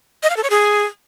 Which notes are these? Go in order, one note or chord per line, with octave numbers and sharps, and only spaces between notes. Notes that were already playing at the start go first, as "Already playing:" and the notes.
D#5
F5
A4
C#5
G#4